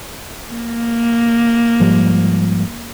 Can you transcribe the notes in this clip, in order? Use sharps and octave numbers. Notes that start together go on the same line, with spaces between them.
A#3
G#2 F3 G3